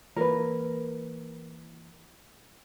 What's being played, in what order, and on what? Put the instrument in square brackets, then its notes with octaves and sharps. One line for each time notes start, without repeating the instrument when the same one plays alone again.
[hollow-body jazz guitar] E3 A#3 [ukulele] A#4 B4